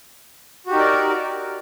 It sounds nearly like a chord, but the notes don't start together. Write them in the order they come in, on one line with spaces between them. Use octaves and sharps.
F#4 G4 D#4 A#4 D5